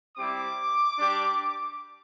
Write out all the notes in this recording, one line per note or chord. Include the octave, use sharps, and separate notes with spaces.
G3 C4 E4 G4 D6
G3 D4 G4